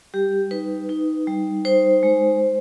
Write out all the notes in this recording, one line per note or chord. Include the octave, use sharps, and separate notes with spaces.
G3 G4
D#4 B4
D#4
G3
D#4 C5
G#3
G#3